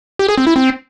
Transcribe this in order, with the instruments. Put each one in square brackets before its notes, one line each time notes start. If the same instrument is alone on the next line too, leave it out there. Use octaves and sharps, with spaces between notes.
[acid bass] G4
G#4
C4
E4
C4